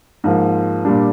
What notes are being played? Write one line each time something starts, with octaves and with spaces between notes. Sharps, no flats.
G#2 F3 A#3
A#2 G3 D4